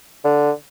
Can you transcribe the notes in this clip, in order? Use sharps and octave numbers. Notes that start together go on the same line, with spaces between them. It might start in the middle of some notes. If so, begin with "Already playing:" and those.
D3